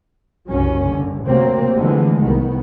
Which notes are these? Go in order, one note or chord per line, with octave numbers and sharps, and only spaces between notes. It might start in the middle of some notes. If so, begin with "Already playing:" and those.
F#1 C2 G2 F#3 C#4
G2 D3
D2 C3 F#3 A#3 C4
D3 E3 F3 G#3 A3 B3
C2 D#3 B3